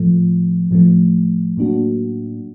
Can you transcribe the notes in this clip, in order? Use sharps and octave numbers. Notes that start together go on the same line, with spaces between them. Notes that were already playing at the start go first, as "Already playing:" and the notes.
Already playing: A2 F3 A3
A2 F3 A3
A2 F#3 A#3 D4 F#4